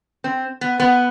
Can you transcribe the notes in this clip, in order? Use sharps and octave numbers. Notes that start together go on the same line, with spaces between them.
C4
B3
B3